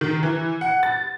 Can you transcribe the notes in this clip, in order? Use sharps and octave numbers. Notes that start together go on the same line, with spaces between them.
D#3
E3
F#5
A6